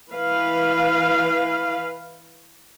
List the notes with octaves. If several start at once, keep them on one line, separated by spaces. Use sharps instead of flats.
E3 B4 F5